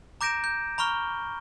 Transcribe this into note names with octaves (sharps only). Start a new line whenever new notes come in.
A#5 D6 G6 A#6 D7 E7
G6
A#5 B5 C#6 F6 G7